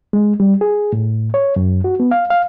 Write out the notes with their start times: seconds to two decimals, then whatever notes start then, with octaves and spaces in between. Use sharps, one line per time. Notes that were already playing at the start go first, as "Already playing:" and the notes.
0.13 G#3
0.40 G3
0.61 G#4
0.93 A2
1.34 C#5
1.56 F#2
1.84 F#4
2.00 B3
2.11 F5
2.30 F5